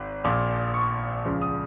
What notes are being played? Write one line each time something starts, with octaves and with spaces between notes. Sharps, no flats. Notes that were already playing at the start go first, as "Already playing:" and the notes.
Already playing: G#1
A#1 A#2 F3
C#6
C#2 C#3 F3
D#6